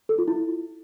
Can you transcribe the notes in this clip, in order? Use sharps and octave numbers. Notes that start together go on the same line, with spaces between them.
A4
F4
E4